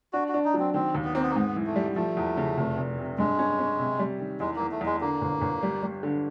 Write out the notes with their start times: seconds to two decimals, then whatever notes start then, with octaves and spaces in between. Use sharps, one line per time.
0.13 D4 F#4
0.28 F#4
0.34 D4
0.45 D#4
0.54 F#3
0.59 C4
0.74 D#3 C4
0.95 D#2
1.04 B3
1.13 A#3 C4
1.22 B3
1.31 A#3
1.35 G#2 B3
1.56 E3
1.66 A3
1.76 G3
1.96 F3 A3
2.17 E2
2.37 C#3
2.57 F1
2.77 F1
2.98 C3
3.18 G2 G#3
3.39 C#4
3.59 C#4
3.79 C3
3.99 G3
4.20 D#3
4.40 E2 G#3
4.56 E2 A#3
4.71 A3
4.81 E2 G#3
5.01 D3 A#3
5.21 G1
5.42 G1
5.63 G3
5.83 G3
6.03 D3